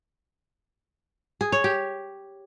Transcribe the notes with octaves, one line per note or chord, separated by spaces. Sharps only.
G#4
C#5
G4